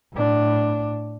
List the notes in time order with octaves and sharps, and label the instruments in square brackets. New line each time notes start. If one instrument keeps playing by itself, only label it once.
[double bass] A2 D4